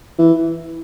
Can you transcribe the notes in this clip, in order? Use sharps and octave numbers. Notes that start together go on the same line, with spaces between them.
E3